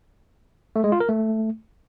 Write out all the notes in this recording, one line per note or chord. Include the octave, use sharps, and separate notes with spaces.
A3
G#3
F4
A#4
A3